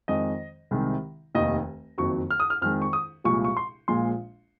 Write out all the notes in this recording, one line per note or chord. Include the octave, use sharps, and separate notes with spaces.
F2 D#3 G#3 D#5
C2 C3 D#3 G#3
F1 D#2 D#3 D#5
F#1 F2 D#3 F#3 C#6
F6
D#6
F6
F2 D#3 G#3 F6
C#6
D#6
C2 A#2 F3 G#3 C#6
C#6
C6
A#1 A#2 F3 G#3 C6